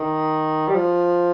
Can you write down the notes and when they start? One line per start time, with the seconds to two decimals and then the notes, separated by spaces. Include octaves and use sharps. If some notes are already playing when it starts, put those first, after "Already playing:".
Already playing: D#3
0.68 G3
0.75 F3